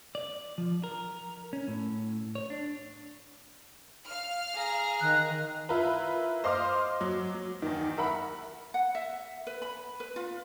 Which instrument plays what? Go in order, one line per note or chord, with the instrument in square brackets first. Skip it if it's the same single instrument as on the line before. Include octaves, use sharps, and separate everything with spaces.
[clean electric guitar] D5
F3
A#4
C#4
A2
C#5
D4
[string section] F5 F6
[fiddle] G#4 A#5
[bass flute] D#3 [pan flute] F#6
[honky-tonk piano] E4 F4 A#4 B4
C5 D#5 F5 C6 D6 F6
F#3
F#3
E2 D#3
A#4 E5 F#5 B5
[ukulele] F#5
E5
B4
B5
B4
F4